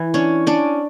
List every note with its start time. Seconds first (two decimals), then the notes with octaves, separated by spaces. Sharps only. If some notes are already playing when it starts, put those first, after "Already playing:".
Already playing: E3 E4
0.14 C#4 D4 C#5
0.47 C#4 D4 D5